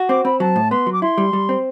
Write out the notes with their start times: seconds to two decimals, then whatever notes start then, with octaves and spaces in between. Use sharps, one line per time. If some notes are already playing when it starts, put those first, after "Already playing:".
Already playing: F#4
0.09 C4 D6
0.24 C4 B5
0.40 F#3 A5
0.56 A2
0.71 B3 C6
0.87 F#3
0.92 D6
1.02 E4 C6
1.18 G3
1.33 G3
1.49 C4